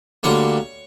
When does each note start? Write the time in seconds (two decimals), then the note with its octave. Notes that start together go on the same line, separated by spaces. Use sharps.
0.23 D2 D3 G3 A#3 C#5